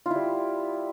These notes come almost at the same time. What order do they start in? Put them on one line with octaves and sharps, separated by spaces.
F4 E4 G3